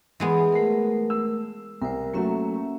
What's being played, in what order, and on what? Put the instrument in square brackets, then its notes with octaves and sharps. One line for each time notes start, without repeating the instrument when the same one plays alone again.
[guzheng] E3 G#3 B3
[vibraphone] A3 A#4
[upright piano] E6
[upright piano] C2 [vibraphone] A#4 C5
[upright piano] F#3 A3 F#4 [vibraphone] A#3 C#4 E5